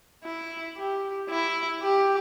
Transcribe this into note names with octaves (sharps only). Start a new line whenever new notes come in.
E4
G4
E4
G4